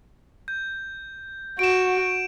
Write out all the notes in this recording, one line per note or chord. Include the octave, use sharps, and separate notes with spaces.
G6
F#4 D7 E7